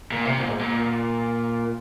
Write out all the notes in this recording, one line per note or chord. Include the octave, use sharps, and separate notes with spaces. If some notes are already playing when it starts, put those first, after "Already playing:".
A#2
C3
A#2
G#2
A#2